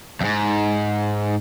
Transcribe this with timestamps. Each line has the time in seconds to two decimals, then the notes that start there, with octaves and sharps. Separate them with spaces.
0.21 F2 G#2